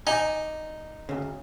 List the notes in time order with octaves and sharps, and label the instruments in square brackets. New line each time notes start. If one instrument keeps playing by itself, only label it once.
[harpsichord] D#4 [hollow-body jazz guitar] D5 G#5
[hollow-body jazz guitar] D2 C#3